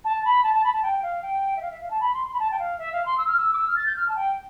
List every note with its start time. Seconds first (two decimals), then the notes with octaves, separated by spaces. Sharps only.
0.05 A5
0.25 B5
0.43 A5
0.54 A5
0.64 B5
0.73 A5
0.83 G5
1.03 F5
1.22 G5
1.57 E5
1.62 F5
1.71 E5
1.82 F5
1.91 A5
2.01 B5
2.14 C6
2.27 C6
2.34 B5
2.40 A5
2.51 G5
2.59 F5
2.78 E5
2.93 F5
3.06 C6
3.18 E6
3.28 F6
3.38 E6
3.53 D6
3.58 E6
3.68 F6
3.76 A6
3.86 G6
3.96 F6
4.09 A5
4.16 G5